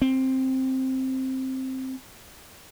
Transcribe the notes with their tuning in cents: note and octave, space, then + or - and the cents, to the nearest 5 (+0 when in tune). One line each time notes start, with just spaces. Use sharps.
C4 +5